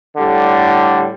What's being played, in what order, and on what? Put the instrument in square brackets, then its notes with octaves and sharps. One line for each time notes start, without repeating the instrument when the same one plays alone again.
[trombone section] A2 D3 G3